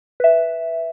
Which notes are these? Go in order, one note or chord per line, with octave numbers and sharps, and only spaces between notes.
B4 E5